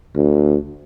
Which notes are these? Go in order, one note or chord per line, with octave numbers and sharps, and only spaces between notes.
D2